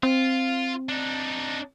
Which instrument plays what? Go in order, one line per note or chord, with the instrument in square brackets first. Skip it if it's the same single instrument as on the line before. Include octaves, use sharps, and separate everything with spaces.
[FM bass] C4 [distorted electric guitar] F4
[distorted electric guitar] D4 D#4